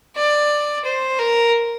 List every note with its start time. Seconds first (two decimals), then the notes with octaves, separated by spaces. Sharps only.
0.16 D5
0.85 C5
1.19 A#4